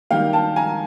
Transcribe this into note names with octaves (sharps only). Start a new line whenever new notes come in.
D#3 G3 A#3 F5 G5
G5 A5
G#5 A#5